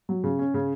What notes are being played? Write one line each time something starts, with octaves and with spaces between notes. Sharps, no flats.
F#3
C#3
C#4
C#3